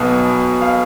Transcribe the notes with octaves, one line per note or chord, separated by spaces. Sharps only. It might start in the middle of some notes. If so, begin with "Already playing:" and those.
Already playing: B1 B2 B3
F5